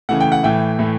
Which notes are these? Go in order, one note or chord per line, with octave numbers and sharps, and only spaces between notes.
C#3 E3 A3 F#5
G5
F#5
A2 E3 A3 G5
A2 E3 A3